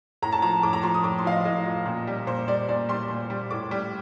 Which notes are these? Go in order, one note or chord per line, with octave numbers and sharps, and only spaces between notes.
A2 A#5
A5
F3 A#5
A2 D6
A#5
F3 C6
D#6
A2 D6
C6
F3 F5
D#5
A2 D#5
F3
A#2
G3
A#2 C5
G3 D5
A#2 D5
G3 C6
A#2
G3
A2 D6
G3